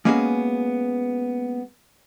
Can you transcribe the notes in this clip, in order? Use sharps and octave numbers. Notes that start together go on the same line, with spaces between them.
G#3 A#3 B3 C#4 F#4 G#4